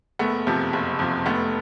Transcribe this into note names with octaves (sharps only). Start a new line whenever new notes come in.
F#1 A3 B3
F2 C3 F3
F#1
F2 C3 F3
F1 A3 B3